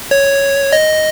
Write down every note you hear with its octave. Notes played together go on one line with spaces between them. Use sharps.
C#5
D#5